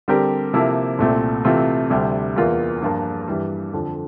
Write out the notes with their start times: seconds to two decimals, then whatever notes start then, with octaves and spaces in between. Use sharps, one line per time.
0.08 D3 G3 C4 G4 A#4
0.53 C3 F3 A#3 E4 A4
0.99 C2 A#2 A3 C4
1.44 C3 E3 A3 C4 F4
1.90 D2 C3 G3 D4
2.36 E2 E3 A#3 F4 A#4
2.82 G2 F3 A#3 F4 A#4
3.28 G2 E3 G3
3.73 F2 D3 F3